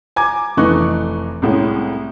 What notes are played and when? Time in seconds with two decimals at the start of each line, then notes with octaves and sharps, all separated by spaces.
0.16 G#5 A#5 D6 G#6
0.57 F1 E3 A3 D#4 C#6 F#6
1.42 C2 A2 G#3 C#4